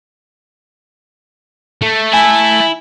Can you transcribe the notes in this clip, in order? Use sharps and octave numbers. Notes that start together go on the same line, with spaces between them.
A3
E4 G#5